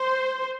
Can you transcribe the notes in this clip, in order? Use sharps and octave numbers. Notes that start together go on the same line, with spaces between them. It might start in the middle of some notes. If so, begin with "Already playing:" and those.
Already playing: C5